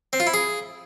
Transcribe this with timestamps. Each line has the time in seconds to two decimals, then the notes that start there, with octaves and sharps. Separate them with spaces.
0.13 C4
0.20 F4
0.27 E4
0.34 G#4